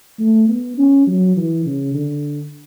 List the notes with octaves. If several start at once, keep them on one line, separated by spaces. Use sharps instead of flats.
A3
B3
C#4
F#3
E3
C#3
D3